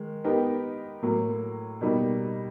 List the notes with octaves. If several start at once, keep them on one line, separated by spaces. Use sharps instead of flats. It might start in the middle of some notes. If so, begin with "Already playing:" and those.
Already playing: D#3 G#3
B3 D#4 G4 A#4
A2 F#3 A#3
B2 G3 A#3 D#4